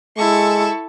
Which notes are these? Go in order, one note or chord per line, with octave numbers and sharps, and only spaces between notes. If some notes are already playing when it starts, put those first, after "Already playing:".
G#3 E4 A4 C#6